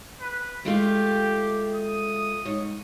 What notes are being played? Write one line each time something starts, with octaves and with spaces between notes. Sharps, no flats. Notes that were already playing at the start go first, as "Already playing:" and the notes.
B4
G#3 A3 F4 G4
D#6
G#2 C#5